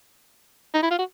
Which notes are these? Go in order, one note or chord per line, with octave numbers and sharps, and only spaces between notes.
D#4
E4
F4
F#4